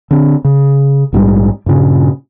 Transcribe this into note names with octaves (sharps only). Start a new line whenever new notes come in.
D3 C4
C#3
A#1 G#2 D#3 G3
G2 A#2 C#3